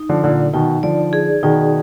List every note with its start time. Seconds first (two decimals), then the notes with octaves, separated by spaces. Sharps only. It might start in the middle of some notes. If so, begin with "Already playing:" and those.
Already playing: D#4
0.09 D3 F3
0.23 A#2 D3 F#3
0.53 B2 D#3 D#4
0.83 D3 F3 D5
1.13 G#4
1.43 B2 D#3 D#4